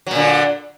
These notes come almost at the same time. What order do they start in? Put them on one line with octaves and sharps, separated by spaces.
F#3 A#2 D3